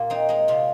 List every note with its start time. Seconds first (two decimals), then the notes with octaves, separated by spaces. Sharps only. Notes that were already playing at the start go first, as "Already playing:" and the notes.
Already playing: A#2 F4 G4
0.10 C4 D#4
0.29 G#3 D#4
0.48 C3 F4